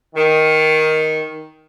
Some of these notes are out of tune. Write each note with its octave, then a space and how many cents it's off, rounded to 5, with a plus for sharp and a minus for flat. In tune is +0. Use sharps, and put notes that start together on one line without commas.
D#3 +10